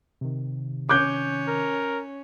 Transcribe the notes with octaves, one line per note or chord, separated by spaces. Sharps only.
C3 D#3
C#4 D6 F#6 G6
A#4